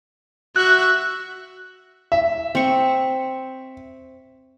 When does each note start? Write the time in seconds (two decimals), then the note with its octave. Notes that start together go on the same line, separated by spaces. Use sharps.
0.56 F#4 E5 F#6
2.12 E5
2.55 C4 C#6